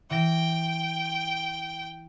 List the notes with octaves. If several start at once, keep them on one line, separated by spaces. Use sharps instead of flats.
E3 G5 A#6